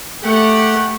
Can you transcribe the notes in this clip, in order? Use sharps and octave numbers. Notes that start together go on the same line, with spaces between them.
A3 G4 F#5